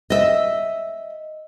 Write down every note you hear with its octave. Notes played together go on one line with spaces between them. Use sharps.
D#5 E5